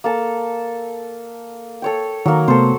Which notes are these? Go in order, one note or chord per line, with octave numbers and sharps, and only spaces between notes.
A#3 A4 A5
A4 C#5 G5
D#3 F#3 A#3
C3 A3 B3 A4 C5